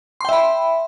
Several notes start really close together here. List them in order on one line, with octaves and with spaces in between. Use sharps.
C6 G5 E5 B5